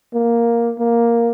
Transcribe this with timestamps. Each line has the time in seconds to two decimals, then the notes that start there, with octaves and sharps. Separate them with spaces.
0.14 A#3
0.79 A#3